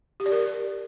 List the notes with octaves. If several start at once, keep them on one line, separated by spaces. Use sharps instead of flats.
G4
D5
A#4